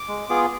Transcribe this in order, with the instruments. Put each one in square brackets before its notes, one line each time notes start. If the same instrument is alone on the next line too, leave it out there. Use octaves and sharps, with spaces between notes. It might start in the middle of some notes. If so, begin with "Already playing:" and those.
Already playing: [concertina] D6
G#3
B3 F4 G#4